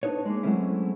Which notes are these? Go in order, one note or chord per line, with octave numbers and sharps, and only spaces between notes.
D4 D#4 B4 C#5
G#3 A#3
F#3 G#3 A3 C4 C#4 E4